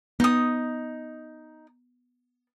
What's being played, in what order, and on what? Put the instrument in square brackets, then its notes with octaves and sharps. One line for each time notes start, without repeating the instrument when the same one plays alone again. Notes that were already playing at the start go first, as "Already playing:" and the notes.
[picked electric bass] B3 [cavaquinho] D#4 D#6